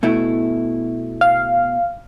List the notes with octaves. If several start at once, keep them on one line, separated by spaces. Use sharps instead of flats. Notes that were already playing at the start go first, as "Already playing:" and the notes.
B2 A3 E4
F5